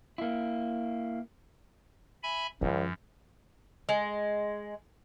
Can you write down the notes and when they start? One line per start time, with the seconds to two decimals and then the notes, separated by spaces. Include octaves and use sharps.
0.18 A#3 E4
2.23 E5 G#5 B5
2.61 C#2 F#2 D#3 F3
3.89 G#3